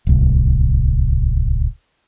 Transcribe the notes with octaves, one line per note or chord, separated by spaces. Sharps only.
D1 C2